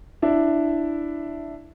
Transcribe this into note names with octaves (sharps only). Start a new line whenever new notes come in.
D4 E4